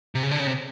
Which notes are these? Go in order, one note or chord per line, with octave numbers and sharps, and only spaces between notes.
C3
C#3
D3
C#3
C3